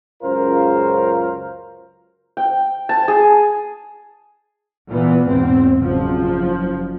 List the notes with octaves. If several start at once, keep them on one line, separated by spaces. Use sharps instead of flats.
C#2 F#2 C#3 F4 A#4 C5
G5
A5
G#4
A#2 E3 B3
E2 G#2 B2 C4
F#1 F3